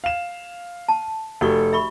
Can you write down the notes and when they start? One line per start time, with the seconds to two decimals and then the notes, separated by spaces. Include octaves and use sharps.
0.04 F5 E7
0.88 A5
1.41 F1 F#4 G4 A4 C#6
1.73 E5 B5 C#6